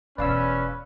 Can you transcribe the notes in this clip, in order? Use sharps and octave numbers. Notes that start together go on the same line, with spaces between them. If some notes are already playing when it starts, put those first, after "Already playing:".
E1 E2 C#4 B4 D5 F5 E6